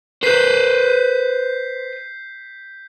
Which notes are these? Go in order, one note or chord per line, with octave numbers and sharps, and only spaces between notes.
B4 C5 G6 B6 C7